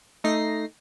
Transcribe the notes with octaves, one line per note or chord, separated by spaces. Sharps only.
A3 D#4 A#6 C7